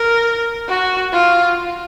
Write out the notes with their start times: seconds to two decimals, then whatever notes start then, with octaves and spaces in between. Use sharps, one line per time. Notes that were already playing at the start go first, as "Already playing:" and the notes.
Already playing: A#4
0.68 F#4
1.12 F4